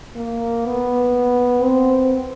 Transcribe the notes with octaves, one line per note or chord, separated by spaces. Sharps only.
A#3
B3
C4